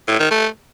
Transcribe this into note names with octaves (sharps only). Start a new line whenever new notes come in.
A2
D#3
A3